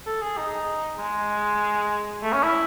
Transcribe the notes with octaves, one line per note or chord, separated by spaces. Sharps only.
A4
G#4
D#4
G#3
A3
C#4
E4